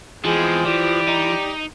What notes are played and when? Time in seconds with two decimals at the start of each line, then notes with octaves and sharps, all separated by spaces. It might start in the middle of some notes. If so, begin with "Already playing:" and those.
0.25 E2 E3 F3 G#3 C4 G#4
0.65 E3 G4 D5
1.08 D#4